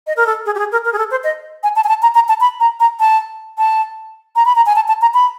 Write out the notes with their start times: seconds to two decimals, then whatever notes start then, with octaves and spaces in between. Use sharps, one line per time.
0.07 D#5
0.17 A#4
0.26 A4
0.46 G#4
0.55 G4
0.59 G#4
0.72 A#4
0.85 A#4
0.93 G#4
0.98 A4
1.11 C5
1.24 D#5
1.63 G#5
1.76 A5
1.84 G#5
1.89 A5
2.02 A#5
2.15 A#5
2.29 A5
2.40 B5
2.60 A#5
2.80 A#5
3.00 A5
3.58 A5
4.36 A#5
4.45 B5
4.56 A#5
4.66 G#5
4.76 A5
4.88 A5
5.02 A#5
5.14 B5